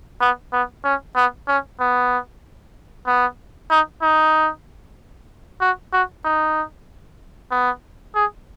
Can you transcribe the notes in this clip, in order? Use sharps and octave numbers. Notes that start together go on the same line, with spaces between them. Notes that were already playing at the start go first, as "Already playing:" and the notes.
B3
B3
C#4
B3
C#4
B3
B3
D#4
D#4
F#4
F#4
D#4
B3
G#4